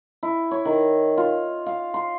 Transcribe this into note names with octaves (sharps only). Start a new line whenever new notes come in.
E4
C#5
D#3
F4
F5
C6